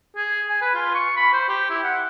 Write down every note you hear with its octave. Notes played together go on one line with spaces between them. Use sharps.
G#4
G#5
B4
F4
C#6
B5
C5
G4
E4
F#5